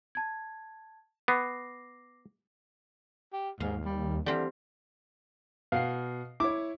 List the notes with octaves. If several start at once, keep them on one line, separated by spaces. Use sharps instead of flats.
A5 G#6
B3 D6 A#6 C7
G4
D#2 G#2 F5
G3
D3 E3 G3 C4 F5
B2 F5 F#5 C7
E4 C#5 D6